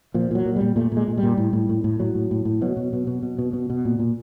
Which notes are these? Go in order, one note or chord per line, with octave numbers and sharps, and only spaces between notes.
A#2 F3
A#2 F#3
A#2
A#2 G3
A#2 A3
A#2 G#3
A#2
G3
A#2
A2
A2
A2
A2
A2 F#3
A2
A2
A2
B2 F#3
B2
B2
B2
B2
B2
B2
B2
A#2
A#2